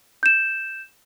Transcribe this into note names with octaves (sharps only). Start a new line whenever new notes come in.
G6 E7